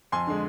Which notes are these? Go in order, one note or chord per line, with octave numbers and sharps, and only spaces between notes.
F2 G#5 C6
D3 G#3